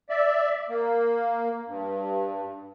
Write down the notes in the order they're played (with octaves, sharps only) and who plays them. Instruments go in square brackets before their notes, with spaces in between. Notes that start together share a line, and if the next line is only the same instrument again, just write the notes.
[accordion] D5 E5
A#3
G2